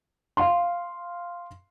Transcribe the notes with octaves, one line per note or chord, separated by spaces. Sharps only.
F5 C6